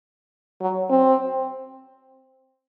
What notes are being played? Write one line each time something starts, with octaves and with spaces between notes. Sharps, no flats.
F#3
C4